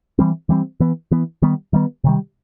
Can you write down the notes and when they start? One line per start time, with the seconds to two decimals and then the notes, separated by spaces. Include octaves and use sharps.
0.19 E3 G3 C4
0.49 E3 G3 C4
0.80 E3 B3
1.11 E3 B3
1.42 D#3 G3 B3
1.73 D#3 G3 B3
2.04 C3 D#3 G3